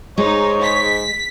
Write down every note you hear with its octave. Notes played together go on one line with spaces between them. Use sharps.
G#2 G#3 D#4 C#5
B6